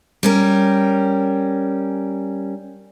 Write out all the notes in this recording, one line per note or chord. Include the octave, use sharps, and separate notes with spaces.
G3 C#4 A#4